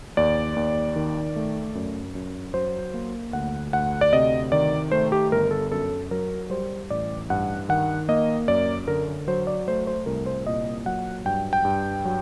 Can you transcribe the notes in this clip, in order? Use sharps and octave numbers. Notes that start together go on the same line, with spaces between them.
D#2 D5
D#2
D#3
A3
F#2
F#2
F#3 C5
A#3
D2 F#5
D2 F#5
D5
C3 D#5
D#3 D5
A3 C5
G4
G1 A#4
A4
F#2 A4
F#3 A#4
G3 C5
A1 D5
G2 F#5
D#3 F#5
A#3 D#5
F#2 D5
D3 A#4
F#3 C5
D5
A3 C5
C5
C2 A#4
C5
A#2 D#5
F#3 F#5
G2 G5
G5
G2
F#3